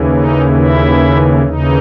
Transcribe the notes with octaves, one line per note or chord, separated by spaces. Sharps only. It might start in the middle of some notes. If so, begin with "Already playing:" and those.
Already playing: D#2 C#3 E3
D#4
E4
D#2 C#3 E3 D#4